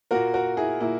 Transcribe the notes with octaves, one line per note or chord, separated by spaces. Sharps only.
A#2 A#3 F#4 A#4
F#4 A#4
E4 G#4
A#2 A#3 E4